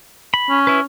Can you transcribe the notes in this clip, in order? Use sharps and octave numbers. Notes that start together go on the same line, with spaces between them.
B5
C#4
E4 B4